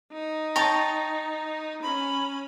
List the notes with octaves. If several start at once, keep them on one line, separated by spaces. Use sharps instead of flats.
D#4
C#5 G5 A5 A#5 A6
C#4 B5